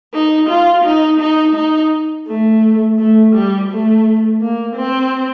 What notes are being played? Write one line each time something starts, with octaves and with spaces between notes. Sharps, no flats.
D#4
F4
D#4
D#4
D#4
A3
A3
G3
A3
A#3
C4